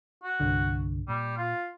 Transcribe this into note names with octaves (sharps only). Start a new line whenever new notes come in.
F#4
C2 G2 D3
A#2 G3
F4